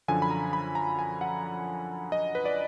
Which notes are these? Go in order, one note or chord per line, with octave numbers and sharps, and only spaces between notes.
F#2 D3 F3 G#5
B5
A#5
B5
A#5
G#5
F#5
D#5
B4
D5